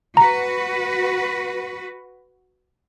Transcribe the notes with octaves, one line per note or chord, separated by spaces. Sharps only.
F#4 B4 A#5